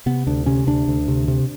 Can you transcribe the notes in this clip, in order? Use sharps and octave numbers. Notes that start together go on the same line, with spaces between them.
C3 B3
D2 D4
C3 C#4
D2 D4
D2
C3
C3